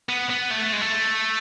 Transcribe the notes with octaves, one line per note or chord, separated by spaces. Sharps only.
B3
B3
A3
G#3
A3